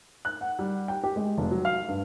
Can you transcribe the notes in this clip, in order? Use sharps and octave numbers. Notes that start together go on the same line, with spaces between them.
F#6
F#5
G3
G5
G4
G#3
F1
F#3
F5
G2